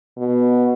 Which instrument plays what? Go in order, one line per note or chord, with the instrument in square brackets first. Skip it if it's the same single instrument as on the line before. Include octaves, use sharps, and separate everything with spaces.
[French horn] B2